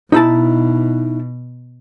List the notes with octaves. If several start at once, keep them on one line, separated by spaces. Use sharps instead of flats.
B2 D#4 E4 A5